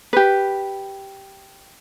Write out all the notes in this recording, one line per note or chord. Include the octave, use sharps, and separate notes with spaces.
G4 B4